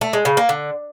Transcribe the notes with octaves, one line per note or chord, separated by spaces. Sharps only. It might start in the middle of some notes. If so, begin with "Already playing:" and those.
A3
G#3
C#3
A#3
D3